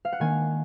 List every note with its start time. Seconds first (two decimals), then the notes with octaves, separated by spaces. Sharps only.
0.05 F5
0.13 F#5
0.20 D#3 A#3 D4 G#5